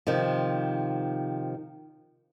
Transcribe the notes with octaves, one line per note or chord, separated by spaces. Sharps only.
C3 D#3 F3